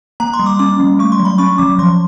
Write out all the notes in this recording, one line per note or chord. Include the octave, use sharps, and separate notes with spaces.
A#3 A#5
C6
G3
D6
C#4 D6
G3
A3 C#6
C6
F#3
B5
C#4 C#6
F#3 D6
F3 C6